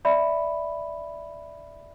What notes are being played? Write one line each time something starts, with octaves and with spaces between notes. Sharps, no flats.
D5 E5 B5